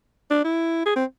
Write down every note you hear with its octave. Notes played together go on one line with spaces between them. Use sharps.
D4
E4
G#4
C4